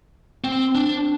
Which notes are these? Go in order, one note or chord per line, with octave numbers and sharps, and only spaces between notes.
C4
D4